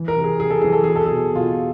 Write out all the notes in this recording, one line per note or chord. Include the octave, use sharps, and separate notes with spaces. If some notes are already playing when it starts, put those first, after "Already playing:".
Already playing: E3
A#4
C3
G#4
C3 G#4
A4
E3 G#4
A4
B2 G#4
A4
G#4
B2
B2 F4